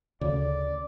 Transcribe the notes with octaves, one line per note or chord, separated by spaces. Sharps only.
D2 C#3 D5